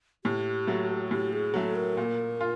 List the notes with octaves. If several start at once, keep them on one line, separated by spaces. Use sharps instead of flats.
A2 G4
F#3 A3
A2 G4
G#4
F#3 A3 A4
A#4
A#2
F4